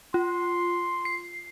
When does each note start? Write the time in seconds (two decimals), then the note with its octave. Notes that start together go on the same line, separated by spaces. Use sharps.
0.14 F4 C6
1.05 C7